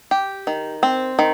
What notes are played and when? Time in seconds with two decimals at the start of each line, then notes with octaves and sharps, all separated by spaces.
0.11 G4
0.47 D#3
0.83 C4
1.19 D#3